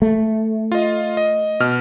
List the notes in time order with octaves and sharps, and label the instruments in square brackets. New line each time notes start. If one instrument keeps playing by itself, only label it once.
[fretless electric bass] A3
[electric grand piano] F4 D#5
D#5
B2 F6